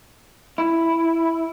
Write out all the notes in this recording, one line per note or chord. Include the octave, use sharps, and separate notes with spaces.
E4